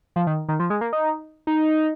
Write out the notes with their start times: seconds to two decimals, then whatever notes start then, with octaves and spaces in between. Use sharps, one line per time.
0.16 F3
0.27 D#3
0.48 D#3
0.60 F3
0.70 G#3
0.81 A#3
0.93 D#4
1.47 D#4